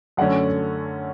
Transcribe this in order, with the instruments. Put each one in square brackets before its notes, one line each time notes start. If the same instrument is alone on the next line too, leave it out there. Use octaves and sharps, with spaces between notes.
[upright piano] F#2 D3 A3 C#4 F#5